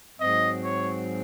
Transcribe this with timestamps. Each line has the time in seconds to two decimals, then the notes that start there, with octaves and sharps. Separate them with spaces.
0.19 G#2 F#3 C4 D#5
0.61 C#5